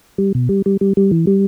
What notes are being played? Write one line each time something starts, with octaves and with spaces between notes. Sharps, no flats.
G3
B2
G3
G3
G3
G3
E3
G3